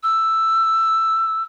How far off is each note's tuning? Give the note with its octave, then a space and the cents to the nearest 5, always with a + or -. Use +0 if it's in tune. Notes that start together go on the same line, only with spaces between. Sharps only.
E6 +5